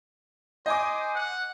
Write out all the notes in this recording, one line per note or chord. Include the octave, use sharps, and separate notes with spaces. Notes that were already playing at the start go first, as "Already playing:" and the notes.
C5 D#5 G#5 D6
F#5